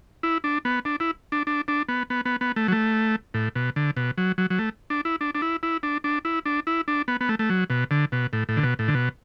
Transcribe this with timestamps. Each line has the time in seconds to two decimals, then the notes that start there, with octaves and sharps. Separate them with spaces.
0.23 E4
0.44 D4
0.65 B3
0.85 D4
1.00 E4
1.32 D4
1.47 D4
1.68 D4
1.89 B3
2.10 B3
2.25 B3
2.41 B3
2.56 A3
2.68 F#3
2.72 A3
3.34 A2
3.55 B2
3.76 D3
3.97 B2
4.18 F#3
4.38 F#3
4.50 F#3
4.59 A3
4.90 D4
5.05 E4
5.21 D4
5.35 D4
5.42 E4
5.63 E4
5.83 D4
6.04 D4
6.25 E4
6.46 D4
6.67 E4
6.88 D4
7.08 B3
7.21 B3
7.29 A3
7.39 A3
7.50 F#3
7.70 B2
7.91 D3
8.12 B2
8.33 A2
8.49 A2
8.57 D3
8.63 B2
8.79 A2
8.88 D3
8.94 B2